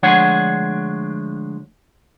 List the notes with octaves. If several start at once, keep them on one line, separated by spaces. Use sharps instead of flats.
D2 F3 G#3 D4 C#5 F#5